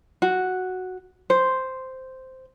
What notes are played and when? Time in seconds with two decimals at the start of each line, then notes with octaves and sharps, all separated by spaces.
0.22 F#4
1.30 C5